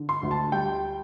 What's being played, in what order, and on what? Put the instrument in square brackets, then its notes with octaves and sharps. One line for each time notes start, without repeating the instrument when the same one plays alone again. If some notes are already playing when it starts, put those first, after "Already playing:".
Already playing: [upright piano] D3
C6
D2
A5
G3 G5